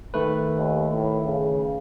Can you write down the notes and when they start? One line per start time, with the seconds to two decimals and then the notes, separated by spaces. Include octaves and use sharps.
0.14 D#3 A3 B4
0.57 D#2
0.93 A2
1.26 C#3